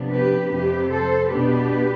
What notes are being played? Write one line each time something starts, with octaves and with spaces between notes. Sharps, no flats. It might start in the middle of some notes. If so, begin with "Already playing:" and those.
Already playing: C3 F3 B3 D4
G4 B4
F2 C3 F3 C4 G4 B4
A4 C5
B2 B3 D4 G4 B4